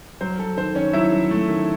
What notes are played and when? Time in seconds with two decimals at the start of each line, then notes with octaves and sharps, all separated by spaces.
0.21 F#3 C5
0.39 F#3 A4
0.57 D#3 C5
0.75 D#3 C#4 C#5
0.93 F#3 E4 E5
1.12 F#3
1.31 A3
1.49 D#3